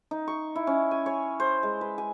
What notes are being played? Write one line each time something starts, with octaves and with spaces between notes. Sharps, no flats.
D#4
C#6
E4
C#4
G#5
C#5
C5
G#3
B4
G#5